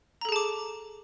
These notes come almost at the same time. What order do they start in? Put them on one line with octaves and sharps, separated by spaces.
A#5 A4 G#4 A5 D6